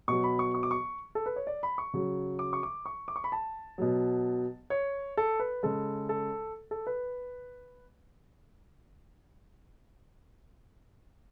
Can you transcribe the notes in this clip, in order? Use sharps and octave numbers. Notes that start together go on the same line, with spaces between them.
B2 F#3 C#6
B5
C#6
C#6
D6
C#6
A4
B4
C#5
D5
B5
C#6
C#3 F#3
D6
C#6
D6
C#6
D6
C#6
B5
A5
B2 F#3
C#5
A4
B4
C#3 G#3 A4
A4
A4
B4